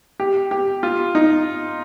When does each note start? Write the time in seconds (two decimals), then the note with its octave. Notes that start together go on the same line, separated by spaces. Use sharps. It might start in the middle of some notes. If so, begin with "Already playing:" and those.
0.20 G4
0.51 G4
0.83 F4
1.15 D#4